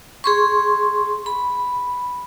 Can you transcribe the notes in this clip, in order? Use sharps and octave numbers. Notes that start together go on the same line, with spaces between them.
G#4 C6 C#6
B5